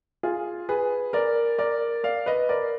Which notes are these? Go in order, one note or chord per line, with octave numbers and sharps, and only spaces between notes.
F4 G#4
G#4 B4
A#4 D5
A#4 D5
D5 F5
B4 D#5
A#4 D5